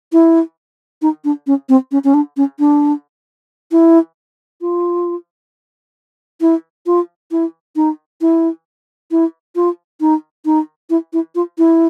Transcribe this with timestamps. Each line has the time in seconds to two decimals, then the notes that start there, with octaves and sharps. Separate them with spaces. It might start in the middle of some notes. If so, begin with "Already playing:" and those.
0.12 E4
1.02 D#4
1.24 D4
1.47 C#4
1.69 C4
1.92 C#4
2.04 C#4
2.14 D4
2.37 C#4
2.59 D4
3.72 E4
4.61 F4
6.41 E4
6.86 F4
7.31 E4
7.76 D#4
8.21 E4
9.11 E4
9.55 F4
10.01 D#4
10.45 D#4
10.90 E4
11.13 E4
11.35 F4
11.58 E4